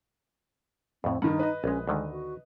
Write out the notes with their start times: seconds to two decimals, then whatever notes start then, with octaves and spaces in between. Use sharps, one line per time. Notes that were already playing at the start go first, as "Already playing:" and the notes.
1.04 F2 A2 C4
1.22 G2 D#3 D#4 F#5
1.39 B4 D#5
1.64 A#1 G#3 C#4
1.87 D2 D3 D#3 G#3
2.11 F#4